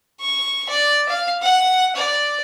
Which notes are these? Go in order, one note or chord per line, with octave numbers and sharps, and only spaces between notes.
C#6
D5
F5
F#5
D5